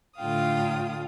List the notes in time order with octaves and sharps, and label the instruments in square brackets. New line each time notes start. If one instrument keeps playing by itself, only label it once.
[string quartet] A2 D3 F4 F5 G5 D#6